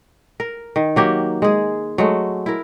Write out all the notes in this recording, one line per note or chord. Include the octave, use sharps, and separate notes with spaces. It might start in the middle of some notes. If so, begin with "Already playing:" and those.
A#4
D#3
F#3 A#3 G4
G#3 G#4
F#3 G#3 A3
E4 A#4